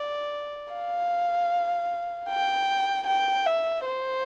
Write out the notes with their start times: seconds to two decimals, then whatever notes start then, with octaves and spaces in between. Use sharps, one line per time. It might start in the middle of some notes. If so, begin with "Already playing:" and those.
Already playing: D5
0.73 F5
2.29 G5
3.07 G5
3.46 E5
3.86 C5